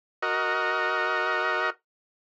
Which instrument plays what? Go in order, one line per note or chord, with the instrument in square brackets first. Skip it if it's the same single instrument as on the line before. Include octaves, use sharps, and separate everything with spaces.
[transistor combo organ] F#4 A#4 D#5